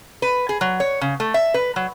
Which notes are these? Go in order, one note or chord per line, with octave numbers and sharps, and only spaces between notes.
B4
G#4
F#3
C#5
C#3
A3
E5
B4
F#3